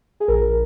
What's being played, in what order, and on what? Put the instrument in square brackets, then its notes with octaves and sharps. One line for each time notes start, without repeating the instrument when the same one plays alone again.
[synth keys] G#4
A#1 A#4